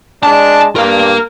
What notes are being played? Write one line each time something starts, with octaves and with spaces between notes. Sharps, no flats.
G#3 D4 A5
G2 A#4 F5